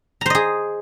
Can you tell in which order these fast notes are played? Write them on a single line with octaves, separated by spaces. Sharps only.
A#5 C5 D#5 G#4